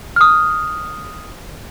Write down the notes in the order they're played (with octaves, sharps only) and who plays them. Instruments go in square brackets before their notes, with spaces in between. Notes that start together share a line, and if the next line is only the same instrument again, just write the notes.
[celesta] D#6 F6